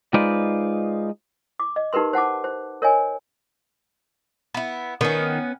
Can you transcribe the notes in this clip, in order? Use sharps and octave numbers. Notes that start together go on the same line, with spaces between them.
G#3 D#4 F4 B4 C5 D5
D6
D#5
D#4 G4 A#4 B4 C6
C5 F#5 A5 D6
C5
A#4 C#5 D#5 G#5
B3 E4
D#3 B3 C#4